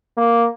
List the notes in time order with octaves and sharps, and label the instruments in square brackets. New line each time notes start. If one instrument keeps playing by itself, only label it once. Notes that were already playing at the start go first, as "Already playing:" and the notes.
[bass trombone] A#3